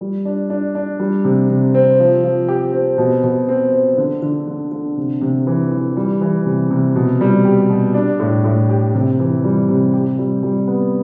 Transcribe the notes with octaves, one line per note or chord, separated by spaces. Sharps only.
G3
D4
D4
D4
G3
C3
C3
C4
F3
F3
G4
C4
B2
B2
C4
C4
D3
D3
D3
D3
C3
C3
E3
E3
G3
E3
C3
C3
B2
G3
G4
B2
D4
A2
A2
G4
C3
E3
G3
C3
G4
G3
G3
B3